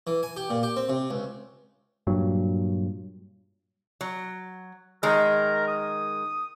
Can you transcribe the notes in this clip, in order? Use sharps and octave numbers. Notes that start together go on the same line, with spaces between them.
E3
G#5
G4
A#2
G4
C4
C3
C#2
G2 A#2 F#3
F#3
D#3 G#3 A#4
D#6